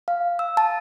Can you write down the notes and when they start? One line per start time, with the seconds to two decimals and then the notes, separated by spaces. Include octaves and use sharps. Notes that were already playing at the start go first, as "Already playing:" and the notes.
0.08 F5
0.39 E6
0.57 A5